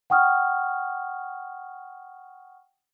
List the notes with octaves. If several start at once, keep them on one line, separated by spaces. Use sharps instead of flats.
F#5 G5 C#6 D#6 F6